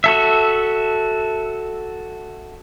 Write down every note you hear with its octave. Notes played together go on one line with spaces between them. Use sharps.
F#4 A4 E5